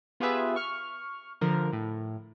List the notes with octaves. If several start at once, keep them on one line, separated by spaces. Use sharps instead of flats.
B3 F4 G4 G#4 B4 E5
C#6 F6
D3 F3 A#4
A2